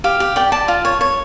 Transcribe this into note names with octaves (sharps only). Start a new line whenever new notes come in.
G4 F5
G4
D5 G5
D5 A5
F4
C#5
C#5